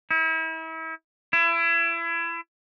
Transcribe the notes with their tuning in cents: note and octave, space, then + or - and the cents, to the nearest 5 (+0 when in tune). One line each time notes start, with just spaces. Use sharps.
E4 -35
E4 +30